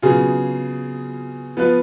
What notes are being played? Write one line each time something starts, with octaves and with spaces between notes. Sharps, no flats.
C#3 F#3 B3 F4 G#4
F3 B3 F4 B4